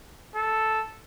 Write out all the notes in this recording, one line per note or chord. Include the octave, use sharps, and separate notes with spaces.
A4